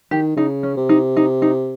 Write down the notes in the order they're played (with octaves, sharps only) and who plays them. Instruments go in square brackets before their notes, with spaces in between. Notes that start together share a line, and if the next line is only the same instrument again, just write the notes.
[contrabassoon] D#3 [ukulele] G4
[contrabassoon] C#3 [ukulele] D#4
[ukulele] C#4
[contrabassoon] C3
[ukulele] D#4
D#4
D#4